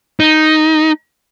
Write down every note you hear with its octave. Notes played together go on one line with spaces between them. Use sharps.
D#4